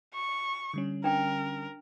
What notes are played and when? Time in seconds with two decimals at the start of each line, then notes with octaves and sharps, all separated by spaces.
0.14 C#6
0.74 D3 G3 C#4
1.04 D4 A#4 G5